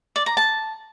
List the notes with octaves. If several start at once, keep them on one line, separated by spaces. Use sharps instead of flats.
D5
A#5
A5